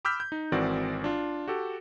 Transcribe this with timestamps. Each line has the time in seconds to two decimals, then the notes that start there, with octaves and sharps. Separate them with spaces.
0.05 B5 D6 E6 F6 G6 B6
0.20 G6
0.32 D#4
0.52 G#1 E3 C4 F#4 A#4 D5
1.04 D4 F4
1.48 F#4 G4 A4